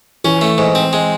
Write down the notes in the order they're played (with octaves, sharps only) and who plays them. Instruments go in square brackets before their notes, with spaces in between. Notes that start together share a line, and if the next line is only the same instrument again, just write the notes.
[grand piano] E3 [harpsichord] C#4
[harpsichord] A3
G#2
C4
G#3